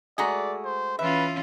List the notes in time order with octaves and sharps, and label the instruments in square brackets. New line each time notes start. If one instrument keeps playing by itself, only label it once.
[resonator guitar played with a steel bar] G#3 A3 F#4 [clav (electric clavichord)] G#4 A#5 [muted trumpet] D5
[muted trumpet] C5
[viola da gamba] E3 C#4 F4 [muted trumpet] B4 [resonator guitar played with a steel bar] E5